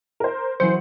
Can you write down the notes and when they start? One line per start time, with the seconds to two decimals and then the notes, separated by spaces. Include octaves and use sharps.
0.20 A#4 C5
0.60 E3 F#3 B4 C5 C#7